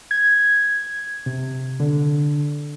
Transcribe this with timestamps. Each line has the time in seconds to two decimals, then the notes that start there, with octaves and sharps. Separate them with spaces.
0.11 G#6
1.26 C3
1.80 D3